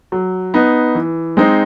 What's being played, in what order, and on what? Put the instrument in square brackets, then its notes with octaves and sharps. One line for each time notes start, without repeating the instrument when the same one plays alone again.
[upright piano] F#3
B3 D#4
E3
G#3 C4 D#4